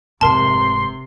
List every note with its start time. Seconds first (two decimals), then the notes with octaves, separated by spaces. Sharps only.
0.21 F1 G#2 C3 A#4 A5 C6